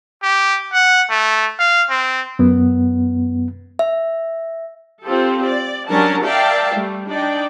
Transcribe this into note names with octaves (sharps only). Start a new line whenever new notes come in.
G4
F#5
A3
F5
C4
F#2 B3
E5
C4 F4 G4 A4
D5
F#3 G3 C#4 D4 A#4 A5
A#4 D5 E5 F5 G5 A5
G3 A3
D4 D#4 D5 G5